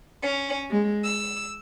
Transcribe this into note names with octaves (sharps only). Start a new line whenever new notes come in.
C#4
G#3
E6